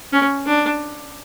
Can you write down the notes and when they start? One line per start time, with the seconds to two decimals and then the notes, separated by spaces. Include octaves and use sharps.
0.13 C#4
0.46 D4